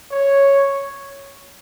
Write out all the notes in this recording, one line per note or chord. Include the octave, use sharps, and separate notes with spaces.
C#5